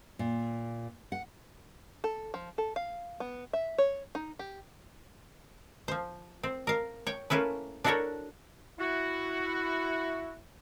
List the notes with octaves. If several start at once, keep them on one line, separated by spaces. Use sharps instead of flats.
A#2
F#5
A4
F3
A4
F5
B3
E5
C#5
D#4
G4
F3 C5
C4
A#4 F5
C#5 G5
A3 A#3 C#4 E4 B4
D4 E4 F#4 A4 A#4 C#5
E4 F#4